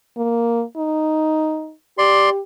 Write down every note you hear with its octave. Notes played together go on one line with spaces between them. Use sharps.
A#3
D#4
G4 D5 C6